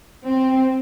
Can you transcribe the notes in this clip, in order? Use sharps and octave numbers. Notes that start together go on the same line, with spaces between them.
C4